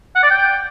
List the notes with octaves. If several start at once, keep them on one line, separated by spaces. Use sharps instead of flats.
F#5
D5
G5